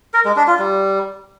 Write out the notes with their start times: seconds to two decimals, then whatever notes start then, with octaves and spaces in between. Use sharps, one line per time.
0.14 A#4
0.25 G#3
0.36 D4
0.47 F4
0.59 G3